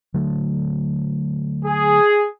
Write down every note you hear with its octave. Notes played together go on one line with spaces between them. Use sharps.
D3 F#3 A3
G#4